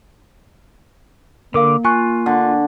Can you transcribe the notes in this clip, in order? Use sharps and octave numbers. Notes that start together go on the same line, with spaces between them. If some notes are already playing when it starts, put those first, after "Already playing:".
D3 A#3 A#4 F5 D6
F4 G#5 C#6 F#6
D3